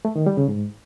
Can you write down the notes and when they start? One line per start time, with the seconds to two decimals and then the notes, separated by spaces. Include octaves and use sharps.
0.05 A3
0.16 D#3
0.26 G3
0.37 C#3
0.48 G#2